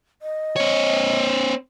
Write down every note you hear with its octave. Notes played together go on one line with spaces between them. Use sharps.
D#5
C4 C#5